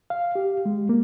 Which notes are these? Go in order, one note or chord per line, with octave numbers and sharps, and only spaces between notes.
F5
G4
G#3
A#3